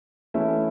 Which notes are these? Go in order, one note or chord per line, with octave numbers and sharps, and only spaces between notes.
E3 A3 C#4 E4